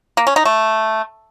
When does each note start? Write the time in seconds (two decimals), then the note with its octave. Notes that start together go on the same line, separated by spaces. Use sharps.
0.17 A#3
0.27 C#4
0.36 D#4
0.45 A3